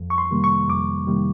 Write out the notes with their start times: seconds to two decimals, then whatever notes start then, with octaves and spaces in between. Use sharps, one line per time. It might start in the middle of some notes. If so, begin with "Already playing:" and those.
Already playing: F2
0.10 C#6
0.18 C6
0.31 C3 D#3 G3 A#3
0.44 C#6
0.68 F2 D6
1.07 C3 D#3 G3 A#3